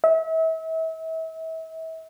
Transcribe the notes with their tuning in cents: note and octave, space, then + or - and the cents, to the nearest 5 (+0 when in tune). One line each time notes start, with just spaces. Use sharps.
E5 -35